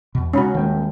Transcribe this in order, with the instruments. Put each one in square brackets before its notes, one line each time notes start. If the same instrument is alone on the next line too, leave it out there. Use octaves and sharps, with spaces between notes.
[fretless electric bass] E2 B2
[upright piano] C#3 D#4 B5 [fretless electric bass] G#3 [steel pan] C#4 F#4
[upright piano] D#1 G5 [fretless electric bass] D#3 G#3